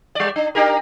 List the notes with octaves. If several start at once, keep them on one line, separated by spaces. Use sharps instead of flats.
G3 D5
D4
D4 G4 A#4